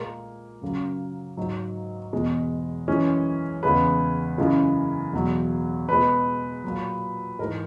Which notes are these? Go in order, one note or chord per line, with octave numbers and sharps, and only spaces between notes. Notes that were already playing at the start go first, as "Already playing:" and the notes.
Already playing: A#2 G#3 A#3
F#2 C#3 F#3
G#2 F#3
E2 B2 G#3
F#2 E3 G#3 C#4
E2 C#3 G#3 B4
F#2 C#3 E3 G#3
E2 B2 F#3
B2 G#3 B4
A#2 F#3
G#2 E3 G#3 A#4